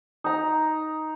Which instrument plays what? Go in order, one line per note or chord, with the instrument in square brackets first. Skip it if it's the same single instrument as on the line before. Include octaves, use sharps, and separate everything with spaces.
[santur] D#4 A#5